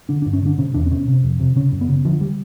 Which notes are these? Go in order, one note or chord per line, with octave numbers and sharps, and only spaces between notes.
D3 D4
D4
G2
C#4
D3 D4
B2 C#4
E2 D4
C4
B2 C#4
C3
F2
C3
C#3 C#4
F#2
B3
C#3
D3 F3
G3